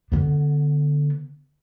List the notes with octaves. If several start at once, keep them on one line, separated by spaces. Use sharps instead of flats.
D3 B3